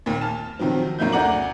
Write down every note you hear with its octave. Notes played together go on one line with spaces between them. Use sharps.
D#2 A#2
A5 F6
C3 D#3 F3 F#3
F#2 B2 A#3 E4 G6
D2 D5 F#5 A#5 D6 F#7